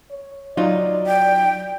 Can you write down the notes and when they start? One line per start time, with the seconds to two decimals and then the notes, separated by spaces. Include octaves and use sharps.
0.10 C#5
0.57 F#3 D#4 F4 D5
1.07 G5